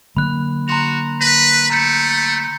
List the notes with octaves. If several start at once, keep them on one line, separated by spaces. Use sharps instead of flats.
D3 F#3 A#3 B5 F#6
F#4 A#5 C6 F7
B4 A#6
A3 A#5 G6 C#7